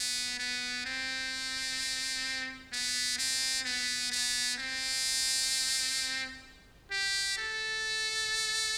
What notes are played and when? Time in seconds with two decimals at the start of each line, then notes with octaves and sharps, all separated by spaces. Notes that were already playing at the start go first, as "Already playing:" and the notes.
Already playing: B3
0.39 B3
0.85 C4
2.73 B3
3.18 C4
3.65 B3
4.12 B3
4.58 C4
6.91 G4
7.38 A4